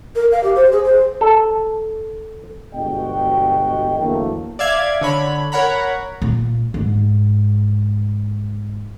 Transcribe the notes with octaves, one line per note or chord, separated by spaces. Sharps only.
A#4
F5
G4
C5
G#4
C5
A4
G1 B2 G#3 F#4 D#5 G5
E2 D3 F#3 A3 A#3
D5 E5 F5 G#6
D3 C#5 B5
A#4 C#5 F#5 A#5 B5
A#2
G#2